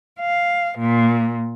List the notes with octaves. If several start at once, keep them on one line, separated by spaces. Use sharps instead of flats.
F5
A#2